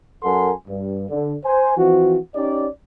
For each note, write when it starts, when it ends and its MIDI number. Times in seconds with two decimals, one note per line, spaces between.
0.23 0.52 42
0.23 0.52 69
0.23 0.52 70
0.23 0.52 78
0.23 0.52 80
0.23 0.52 84
0.68 1.06 43
1.09 1.34 50
1.44 1.74 72
1.44 1.74 80
1.77 2.17 52
1.77 2.17 53
1.77 2.17 60
1.77 2.17 66
2.35 2.67 61
2.35 2.67 63
2.35 2.67 67
2.35 2.67 74